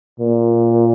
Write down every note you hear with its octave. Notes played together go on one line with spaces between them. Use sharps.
A#2